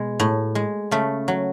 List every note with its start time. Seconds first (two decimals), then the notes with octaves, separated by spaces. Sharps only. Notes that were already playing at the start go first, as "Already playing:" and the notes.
Already playing: B2 G#3
0.20 A2
0.55 G#3
0.91 C#3 A3
1.28 F#3